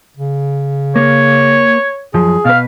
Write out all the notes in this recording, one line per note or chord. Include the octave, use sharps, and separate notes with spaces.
C#3
A#3 C#5
F#2 F3 G#4
B2 B4 F5